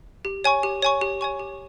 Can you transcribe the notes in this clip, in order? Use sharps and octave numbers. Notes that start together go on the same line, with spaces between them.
G4
C#5 G#5 C#6
G4
C#5 G#5 C#6
G4
C#5 G#5 C#6
G4